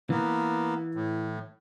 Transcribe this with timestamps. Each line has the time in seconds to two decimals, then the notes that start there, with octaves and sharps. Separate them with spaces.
0.10 E3 A#3 B3
0.95 A2